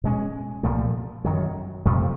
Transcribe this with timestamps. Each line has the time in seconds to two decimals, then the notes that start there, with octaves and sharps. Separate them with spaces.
0.04 B2 G#3 C#4
0.63 C2 A#2 F3 A3
1.24 F#2 D#3 F#3
1.86 F2 C3 F3 A3